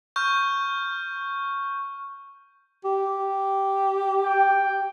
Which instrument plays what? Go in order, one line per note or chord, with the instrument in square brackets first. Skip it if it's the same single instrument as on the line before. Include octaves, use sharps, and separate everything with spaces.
[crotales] C#6 F6 G6
[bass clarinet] G4
[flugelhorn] G5